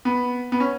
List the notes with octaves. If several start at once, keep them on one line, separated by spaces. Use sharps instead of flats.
B3
B3
C#4